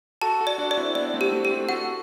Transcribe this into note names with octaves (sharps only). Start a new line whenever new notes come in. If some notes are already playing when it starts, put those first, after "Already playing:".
F#4 A4 A5
F#4 A4
D5
D4 F#4
D5
C4 E4
B3 D4 D5
A3 C4
G4
A3 C4
G4
A3 C4
F#4 A4 F#5